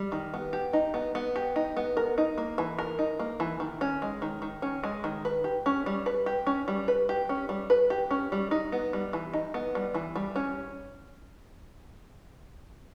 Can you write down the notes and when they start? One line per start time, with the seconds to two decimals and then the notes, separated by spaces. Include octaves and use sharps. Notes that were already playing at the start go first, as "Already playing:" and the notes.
Already playing: G3
0.12 D#3
0.34 B3
0.53 G4
0.73 D#4
0.94 B3
1.15 B3
1.36 G4
1.56 D#4
1.77 B3
1.97 A#4
2.18 D#4
2.38 A#3
2.58 E3
2.79 A#4
2.99 D#4
3.19 A#3
3.40 E3
3.60 D#3
3.81 C#4
4.02 G#3
4.22 D#3
4.42 D#3
4.62 C#4
4.84 G#3
5.04 D#3
5.25 B4
5.44 G4
5.66 C#4
5.86 G3
6.06 B4
6.26 G4
6.47 C#4
6.68 G3
6.88 B4
7.09 G4
7.29 C#4
7.49 G3
7.70 B4
7.90 G4
8.11 C#4
8.32 G3
8.51 D#4
8.72 B3
8.93 G3
9.13 E3
9.33 D#4
9.54 B3
9.75 G3
9.95 E3
10.16 G3
10.36 C#4